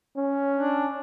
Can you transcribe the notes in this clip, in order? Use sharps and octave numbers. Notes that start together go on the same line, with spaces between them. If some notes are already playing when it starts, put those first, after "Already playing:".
C#4
D4